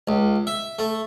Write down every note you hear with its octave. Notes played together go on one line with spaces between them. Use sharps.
C#2
E5
A3